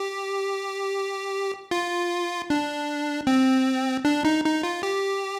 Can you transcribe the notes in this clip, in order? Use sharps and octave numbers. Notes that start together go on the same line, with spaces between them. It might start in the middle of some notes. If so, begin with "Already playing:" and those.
Already playing: G4
F4
D4
C4
D4
D#4
D#4
F4
G4